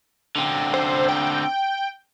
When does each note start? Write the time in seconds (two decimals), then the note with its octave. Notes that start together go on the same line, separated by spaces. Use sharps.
0.36 D3 C4
0.74 C5
1.09 G5